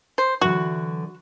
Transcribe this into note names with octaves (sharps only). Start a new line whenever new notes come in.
C5
D3 E3 F#3 F#4